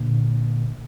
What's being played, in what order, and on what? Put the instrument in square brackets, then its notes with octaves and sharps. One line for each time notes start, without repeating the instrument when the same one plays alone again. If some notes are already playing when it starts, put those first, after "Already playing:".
Already playing: [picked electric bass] A#2 D3